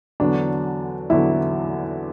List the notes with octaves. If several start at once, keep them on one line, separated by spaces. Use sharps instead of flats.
E2 D3 F#3 D4
E2 D3 F#3 E4